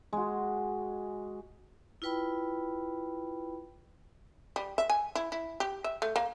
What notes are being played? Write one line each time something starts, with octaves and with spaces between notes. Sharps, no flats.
G#3 F#4
E4 F4 B4 G5 B5
G3
E5
G#5
E4
E4
G4
E5
A3
A#3